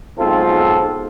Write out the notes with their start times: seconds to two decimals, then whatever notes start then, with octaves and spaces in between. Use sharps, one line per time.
0.18 B1 G#2 C4 F4 A4